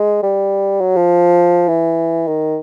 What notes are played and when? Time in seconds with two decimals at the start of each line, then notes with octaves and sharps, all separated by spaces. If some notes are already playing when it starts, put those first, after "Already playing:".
Already playing: G#3
0.23 G3
0.81 F#3
0.96 F3
1.69 E3
2.28 D#3